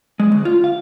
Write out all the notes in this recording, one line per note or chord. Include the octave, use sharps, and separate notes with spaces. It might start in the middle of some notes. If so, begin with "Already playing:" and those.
G#3
D2
F4
F5